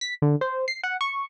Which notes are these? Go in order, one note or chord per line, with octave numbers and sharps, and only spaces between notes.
B6
D3
C5
C7
F#5
C#6